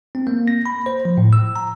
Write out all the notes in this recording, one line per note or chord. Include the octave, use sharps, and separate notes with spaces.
C4
A#3
A#6
B5
C5
F3
A2
E6
A#5